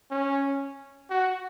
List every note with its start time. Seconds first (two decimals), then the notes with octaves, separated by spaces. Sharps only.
0.11 C#4
1.10 F#4